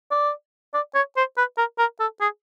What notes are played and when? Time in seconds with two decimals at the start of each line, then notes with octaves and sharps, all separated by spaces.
0.11 D5
0.74 D5
0.95 C#5
1.17 C5
1.37 B4
1.58 A#4
1.79 A#4
2.00 A4
2.21 G#4